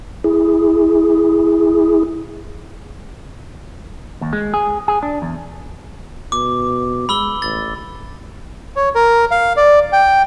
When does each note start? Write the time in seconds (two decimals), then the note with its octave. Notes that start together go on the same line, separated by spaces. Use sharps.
0.24 E4 G#4
4.21 D#2
4.33 G#3
4.54 G#4
4.88 G#4
5.03 D4
5.22 E2
6.32 B2 D6
7.09 G#3 B5 E6 G7
7.42 A1 A6
8.76 C#5
8.95 A#4
9.31 F5
9.57 D5
9.93 G5